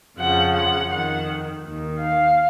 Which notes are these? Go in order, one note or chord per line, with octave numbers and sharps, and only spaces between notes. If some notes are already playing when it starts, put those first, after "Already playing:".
F2 C#3 F3 F#5
F#5
F2 D#3 F#5
D#2 D#3
F5